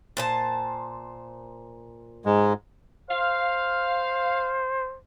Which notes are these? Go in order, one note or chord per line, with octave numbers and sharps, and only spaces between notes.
A#2 C5 A5
G#2 G#3
C5 F5